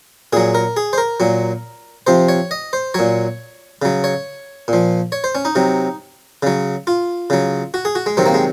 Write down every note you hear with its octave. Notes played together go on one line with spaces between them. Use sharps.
A#2 F#3 G#4
A#4
G#4
C5
A#4
A#2 F#3
C3 F3 C5
C#5
D#5
C5
A#2 F#3 C#5
C#3 F#3
C#5
A#2 F3
C#5
C5
C#4
D#4
C3 F#3
C#3 F#3
F4
C#3 F#3
F#4
G#4
F#4
G#3
C3 D#3 F#3 C4
A#3
G#3